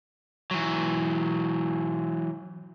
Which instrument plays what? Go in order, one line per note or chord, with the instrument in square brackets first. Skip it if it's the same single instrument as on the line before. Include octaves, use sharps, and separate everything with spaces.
[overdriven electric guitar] E3 F#3